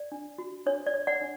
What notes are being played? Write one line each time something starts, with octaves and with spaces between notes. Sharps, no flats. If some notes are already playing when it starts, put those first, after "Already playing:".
Already playing: D5
D4
F#4
D4 C#5
D5
C#5
D5 F#5
D4